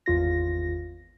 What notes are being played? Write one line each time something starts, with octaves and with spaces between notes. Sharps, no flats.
G#1 E2 F4 A#6